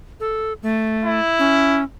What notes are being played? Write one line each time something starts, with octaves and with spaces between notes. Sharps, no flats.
A4
A3
E4
C#4